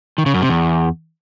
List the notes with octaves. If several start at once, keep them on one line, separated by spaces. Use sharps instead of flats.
D#3
C#3
F#2
C3
E2